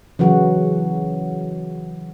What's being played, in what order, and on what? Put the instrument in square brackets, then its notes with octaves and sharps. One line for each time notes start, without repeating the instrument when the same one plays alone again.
[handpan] C#3 E3 F#3 F#4